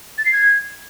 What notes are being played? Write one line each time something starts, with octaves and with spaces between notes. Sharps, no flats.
A6
C7
G#6